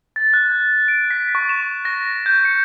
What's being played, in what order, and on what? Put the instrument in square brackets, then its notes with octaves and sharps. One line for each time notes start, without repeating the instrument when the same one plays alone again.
[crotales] A6
F#6
G#6
D7
B6
C#6
E7
A#6
G6
C#7